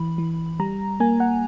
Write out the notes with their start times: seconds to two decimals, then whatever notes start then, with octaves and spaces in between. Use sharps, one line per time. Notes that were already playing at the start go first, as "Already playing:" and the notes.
Already playing: E3 B5
0.18 E3
0.60 G3 A#5
1.00 A#3 G#5
1.20 F#5